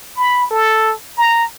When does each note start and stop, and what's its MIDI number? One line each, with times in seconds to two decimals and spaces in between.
0.17 0.49 83
0.51 0.93 69
1.17 1.44 82